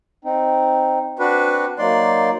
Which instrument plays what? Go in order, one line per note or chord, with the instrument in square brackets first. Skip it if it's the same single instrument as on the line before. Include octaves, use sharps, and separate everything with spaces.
[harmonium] C4 D#4
[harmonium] C4 [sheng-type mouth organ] D4 F#4 B4
[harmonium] F#3 A#3 D#4 [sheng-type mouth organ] D5 C6